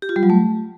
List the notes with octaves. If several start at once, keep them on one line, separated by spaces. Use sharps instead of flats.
G4
F4
G3
F#3
A3